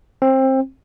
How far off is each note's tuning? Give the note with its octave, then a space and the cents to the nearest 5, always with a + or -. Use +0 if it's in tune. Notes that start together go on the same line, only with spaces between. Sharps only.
C4 +20